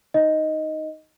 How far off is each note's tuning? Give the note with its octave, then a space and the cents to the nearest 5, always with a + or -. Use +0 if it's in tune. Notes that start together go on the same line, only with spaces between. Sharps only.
D#4 +0 D#5 +5